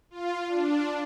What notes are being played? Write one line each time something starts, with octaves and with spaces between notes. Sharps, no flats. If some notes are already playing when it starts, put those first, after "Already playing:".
F4
D4